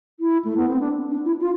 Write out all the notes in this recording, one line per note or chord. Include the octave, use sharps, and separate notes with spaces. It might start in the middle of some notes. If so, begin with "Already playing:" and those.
E4
A3
B3
C4
D4
D4
E4
F4